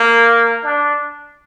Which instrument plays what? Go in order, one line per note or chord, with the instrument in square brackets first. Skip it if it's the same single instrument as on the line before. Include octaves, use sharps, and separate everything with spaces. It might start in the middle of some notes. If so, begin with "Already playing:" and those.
Already playing: [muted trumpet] A#3
D4